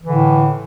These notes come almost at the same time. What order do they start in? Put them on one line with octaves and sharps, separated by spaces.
E3 D3 A2